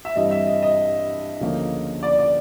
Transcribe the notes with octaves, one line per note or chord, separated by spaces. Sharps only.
E5
G2 E3 G3 C4 D#5
E5
D#5
D#5
D2 C#3 F3 A#3
D5
D5